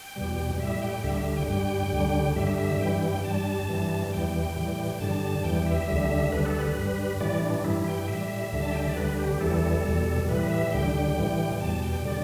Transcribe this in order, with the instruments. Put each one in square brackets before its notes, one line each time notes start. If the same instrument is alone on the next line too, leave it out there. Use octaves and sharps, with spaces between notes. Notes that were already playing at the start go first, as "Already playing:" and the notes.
Already playing: [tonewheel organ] G5
E2 B2 G3
A2 G3 E5
G5
D2 D3 G3 E5
E5
G5
G2 G3 G5
D2 D3 G3
G2 D3 G3 E5
E5
E5
E5
G2 E3 G3 G5
G5
G2 G3 A5
G2 E3 G3
E2 E3 G3 G5
A2 E3 G3
G2 D3 G3 A5
E2 E3 G3 G5
E5
D2 D3 G3
D2 D3 G3 B4
A4
B4
G2 G3
A2 E3 G3 D5
D4
G2 E3 G3 E4
G5
A2 G3 E5
D2 D3 G3
A5
G5
E5
D5
D2 D3 G3 B4
G4
E2 E3 G3 A4
E2 B2 G3
A2 E3 G3 B4
E5
D2 D3 G3 G5
A2 E3 G3
E2 B2 G3 A5
G5
D3 G3 D5